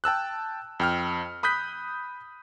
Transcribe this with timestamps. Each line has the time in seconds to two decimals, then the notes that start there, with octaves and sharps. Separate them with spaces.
0.04 G5 A5 E6 F#6
0.80 F2 G5 F6
1.43 B5 D#6 F#6 G6 B6